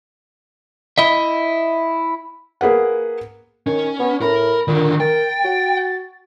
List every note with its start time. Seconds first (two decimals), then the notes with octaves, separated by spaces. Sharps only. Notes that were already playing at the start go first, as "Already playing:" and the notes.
0.98 E4 D#5 E5
2.61 A#3 G#4 B4 F#5
3.67 D#3 C#4
3.99 B3
4.21 A2 A#4 B5
4.68 A#2 D3 D#3
5.00 A#4 G5 A6
5.45 F#4